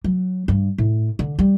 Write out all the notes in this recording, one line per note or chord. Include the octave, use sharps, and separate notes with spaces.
F#3
G2
A2
D3
G3